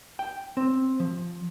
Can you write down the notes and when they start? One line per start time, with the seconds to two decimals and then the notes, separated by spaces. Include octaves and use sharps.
0.19 G5
0.57 C4
1.00 F3